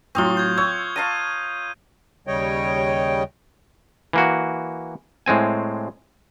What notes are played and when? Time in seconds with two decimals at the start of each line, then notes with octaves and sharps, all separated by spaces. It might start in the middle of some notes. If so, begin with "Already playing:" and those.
0.15 A2 F#3 C4 F4 C#6 D#6 G7
0.37 G6 G#6
0.58 C#5 E6 G#6
0.96 F5 A5 A#5 D#7
2.27 D#2 C#3 G3 C#5 D#5 G5
4.13 E3 A#3 F#4
5.26 A2 G#3 C4 G#5